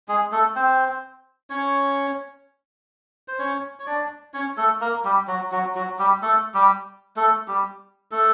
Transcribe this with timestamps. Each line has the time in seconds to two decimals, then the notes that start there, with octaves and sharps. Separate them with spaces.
0.08 G#3 G#4
0.32 A3 A4
0.56 C4 C5
1.50 C#4 C#5
3.28 C5
3.39 C#4 C#5
3.80 C#5
3.86 D4 D5
4.34 C#4 C#5
4.57 A3 A4
4.81 A#3 A#4
5.04 G3 G4
5.28 F#3 F#4
5.52 F#3 F#4
5.75 F#3 F#4
5.99 G3 G4
6.22 A3 A4
6.54 G3 G4
7.17 A3 A4
7.48 G3 G4
8.11 A3 A4